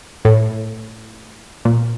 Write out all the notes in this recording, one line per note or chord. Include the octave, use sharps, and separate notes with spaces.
A2
A#2